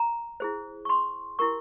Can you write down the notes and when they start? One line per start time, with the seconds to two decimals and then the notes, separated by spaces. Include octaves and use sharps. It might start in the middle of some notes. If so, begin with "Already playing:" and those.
Already playing: A#5
0.40 E4 G#4 C5
0.85 C#6
0.89 C6
1.39 E4 G4 A#4 C#6